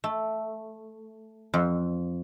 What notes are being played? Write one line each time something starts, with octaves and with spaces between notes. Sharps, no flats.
A3
F2